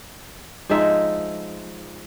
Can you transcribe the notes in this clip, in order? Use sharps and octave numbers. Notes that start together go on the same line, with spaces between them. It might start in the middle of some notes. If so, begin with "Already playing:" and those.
F3 G#3 D#4 E5